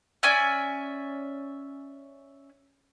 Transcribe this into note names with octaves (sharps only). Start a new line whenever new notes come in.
C#4 D5 E5 G#5